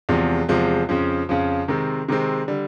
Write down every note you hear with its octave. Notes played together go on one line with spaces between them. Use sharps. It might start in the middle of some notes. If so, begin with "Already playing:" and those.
E2 C3 F3 G#3
E2 C3 F3 G#3
F2 C#3 F3
F2 C#3 F3
C3 D#3 G#3 C4
C3 D#3 G#3 C4
D3 G3